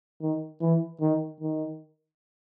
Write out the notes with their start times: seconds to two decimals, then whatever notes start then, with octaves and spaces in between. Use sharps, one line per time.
0.22 D#3
0.61 E3
1.01 D#3
1.40 D#3